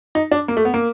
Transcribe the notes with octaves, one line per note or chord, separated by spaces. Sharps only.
D#4
D4
A#3
A3
B3
A#3